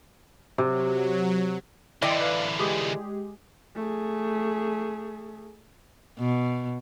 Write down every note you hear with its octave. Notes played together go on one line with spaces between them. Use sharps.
C3 F#3
D3 E3 E4 D5 D#5 G5 C6
B4 F5
G#3 G4 G#4
A3 G#4
B2